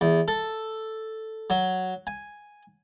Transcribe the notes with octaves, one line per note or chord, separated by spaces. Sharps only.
E2
A4
F#3
G#5